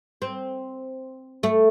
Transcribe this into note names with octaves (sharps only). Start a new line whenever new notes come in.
C4
A3